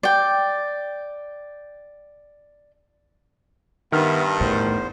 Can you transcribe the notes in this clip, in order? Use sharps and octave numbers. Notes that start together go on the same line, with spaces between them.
D5 G5
G2 D#3 B3 E5 F6
E2 A2 C5